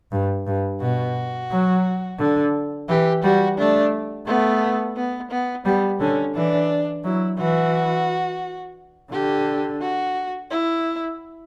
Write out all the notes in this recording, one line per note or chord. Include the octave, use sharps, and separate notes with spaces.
G2
G2
B2 F#4
F#3
D3
E3 G4
G3 F#4
A3 D4
A3 B3
B3
B3
G3 B3
D3 C#4
E3 D4
F#3 E4
E3 F#4
D3 G4
F#4
E4